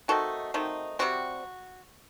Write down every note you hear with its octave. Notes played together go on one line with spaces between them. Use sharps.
D#3 A3 C4 D#4 F#4 A4
D#3 A3 C4 D#4
C3 G3 C4 F#4